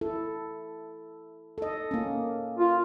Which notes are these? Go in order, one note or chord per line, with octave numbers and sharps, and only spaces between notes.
E4 A4
A4 D#5
A#3 C#4
F4